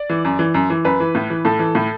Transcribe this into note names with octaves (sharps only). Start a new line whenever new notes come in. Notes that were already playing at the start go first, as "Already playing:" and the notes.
Already playing: D5
E3
F#2
E3
F#2
E3
F#2 B4
E3
A2
E3
A2 A4
E3
A2